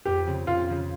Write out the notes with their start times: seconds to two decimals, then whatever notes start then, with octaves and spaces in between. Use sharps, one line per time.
0.05 F2 G4
0.26 C#3 F3 C4
0.47 F2 F4
0.68 C#3 F3 C4